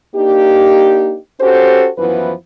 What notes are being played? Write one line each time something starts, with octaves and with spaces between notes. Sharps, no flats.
A#3 D4 D#4 G4
C#4 F#4 G4 A4 C5
F#2 E3 F3 B3 E4 B4